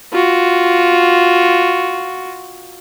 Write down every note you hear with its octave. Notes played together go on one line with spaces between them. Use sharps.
F4 F#4